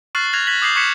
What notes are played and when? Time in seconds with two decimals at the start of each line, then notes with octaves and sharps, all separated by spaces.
0.15 C#6 F6 F#6 A6 C7 F#7
0.33 F6 F#6 G#6 A#6 F7
0.47 F#6 G#6 A#6 B6 F#7
0.62 D6 D#6 G6 G#6 C7 F#7
0.76 C#6 F#6 G#6 B6 C#7 E7